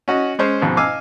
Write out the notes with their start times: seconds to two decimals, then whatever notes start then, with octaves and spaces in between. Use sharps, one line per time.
0.08 C#4 F#4 D#5
0.39 G#3 C#4 C5 C#5
0.61 F2 G#2 B2
0.77 D#5 F5 G#5 D6 E6